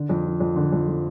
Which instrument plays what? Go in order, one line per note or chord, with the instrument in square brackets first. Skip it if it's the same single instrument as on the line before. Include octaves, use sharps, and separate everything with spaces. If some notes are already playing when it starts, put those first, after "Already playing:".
Already playing: [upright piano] D3
F2
F3
F2
D3
F2
F3